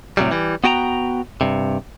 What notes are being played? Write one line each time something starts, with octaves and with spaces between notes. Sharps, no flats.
A2 C3 F#3 G3
E3 G3
B3 F#4 G5 A5 A#5
G2 C3